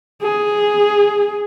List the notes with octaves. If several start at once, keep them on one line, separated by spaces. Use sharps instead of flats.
G#4